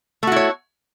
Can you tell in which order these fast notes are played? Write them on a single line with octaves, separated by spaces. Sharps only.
A3 F#4 E4 C#5